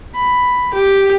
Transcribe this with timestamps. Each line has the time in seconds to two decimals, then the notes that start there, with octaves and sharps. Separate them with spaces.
0.15 B5
0.74 G4